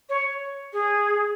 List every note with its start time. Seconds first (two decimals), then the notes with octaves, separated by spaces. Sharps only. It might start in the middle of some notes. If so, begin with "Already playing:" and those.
0.09 C#5
0.73 G#4